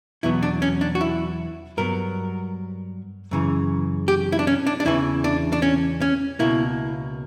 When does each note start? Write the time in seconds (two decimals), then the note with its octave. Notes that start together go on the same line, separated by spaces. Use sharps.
0.23 E2 B2 F#3 B3 E4
0.43 D4
0.62 C#4
0.81 D4
0.95 F#4
1.01 E4
1.77 G2 F#3 B3 A#4
3.31 F#2 C#3 E3
4.08 G4
4.32 E4
4.39 D4
4.47 C#4
4.67 D4
4.80 D4
4.85 E2 C#3 E3 E4
5.24 D4
5.53 D4
5.62 C#4
6.01 C#4
6.39 C#2 B2 A#3 E4